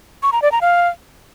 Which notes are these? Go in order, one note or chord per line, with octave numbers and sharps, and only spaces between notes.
C#6
A#5
D5
A#5
F5